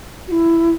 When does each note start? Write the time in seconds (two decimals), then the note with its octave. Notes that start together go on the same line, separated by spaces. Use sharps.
0.27 F#4
0.31 E4